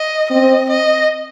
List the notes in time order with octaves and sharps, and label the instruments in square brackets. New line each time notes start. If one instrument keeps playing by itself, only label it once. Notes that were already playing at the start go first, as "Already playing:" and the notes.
Already playing: [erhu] D#5
[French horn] C4 [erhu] D#5
[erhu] D#5